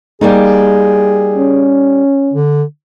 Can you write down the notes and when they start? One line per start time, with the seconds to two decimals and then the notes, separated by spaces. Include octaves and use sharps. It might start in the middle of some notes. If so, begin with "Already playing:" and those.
0.21 G3 A#3 D#4 G#4
1.36 C#4
2.33 D3